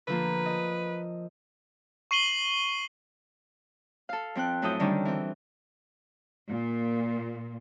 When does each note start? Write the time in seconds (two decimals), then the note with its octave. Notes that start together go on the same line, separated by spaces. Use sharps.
0.07 D3 F3 A#3 B4
0.46 D#5
2.11 C#6 C7 D#7 F#7 G7
4.09 A4 F5
4.35 F2 C4 G5 F#6
4.62 F#2 A2 E4 A4 D#6 G6
4.80 D3 D#3 G3 C#4 D4
5.05 E3 C4
6.49 A#2